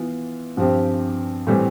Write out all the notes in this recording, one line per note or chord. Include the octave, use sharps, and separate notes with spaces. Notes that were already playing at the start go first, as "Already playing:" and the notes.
Already playing: E3 B3 F4
G2 F3 C4 G4
A2 E3 G3 C4